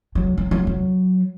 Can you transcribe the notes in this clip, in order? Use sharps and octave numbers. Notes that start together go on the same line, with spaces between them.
F#3
F#3
F#3
F#3